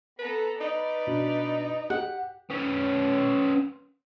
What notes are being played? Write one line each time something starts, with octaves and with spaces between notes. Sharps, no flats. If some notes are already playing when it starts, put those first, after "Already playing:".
B3 A4 B4 A#5
D#4 B4 D5
B2 D4
G4 F#5
B3 C#4